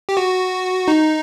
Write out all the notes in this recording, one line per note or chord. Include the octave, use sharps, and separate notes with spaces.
G4
F#4
D#4